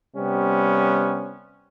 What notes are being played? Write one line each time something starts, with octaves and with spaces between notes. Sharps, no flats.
C3 G3 B3 C#4